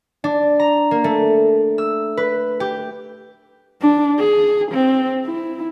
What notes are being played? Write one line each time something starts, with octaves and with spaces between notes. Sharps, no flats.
D4
A#5
A#3
A3
E6
B4
G4
D4
G#4
C4
E4